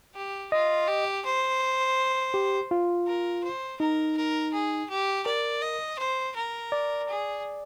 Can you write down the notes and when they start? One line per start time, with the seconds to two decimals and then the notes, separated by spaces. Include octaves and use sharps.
0.15 G4
0.52 F4 D#5
0.88 G4
1.25 C5
2.34 G4
2.71 F4
3.07 A#4
3.44 C5
3.80 D#4 A#4
4.17 A#4
4.53 G#4
4.90 G4
5.26 A#4 D5
5.62 D#5
5.99 C5
6.36 A#4
6.72 D5
7.09 G#4